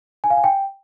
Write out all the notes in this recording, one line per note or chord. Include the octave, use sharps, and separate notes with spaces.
G#5
F5
G#5
G5